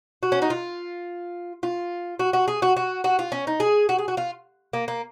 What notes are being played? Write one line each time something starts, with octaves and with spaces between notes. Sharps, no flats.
F#4
C#4
D#4
F4
F4
F#4
F#4
G#4
F#4
F#4
F#4
F4
C#4
D#4
G#4
F#4
G#4
F#4
F4
A#3
A#3